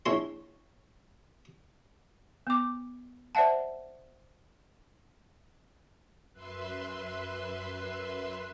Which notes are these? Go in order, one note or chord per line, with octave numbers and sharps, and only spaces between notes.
A#1 E4 C#5 C6
B3 D6
C5 D5 E5 F#5 A5
F#2 B4 E5 C6